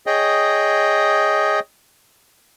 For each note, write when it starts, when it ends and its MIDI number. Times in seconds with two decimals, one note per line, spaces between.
0.06 1.60 68
0.06 1.60 73
0.06 1.60 75
0.06 1.60 79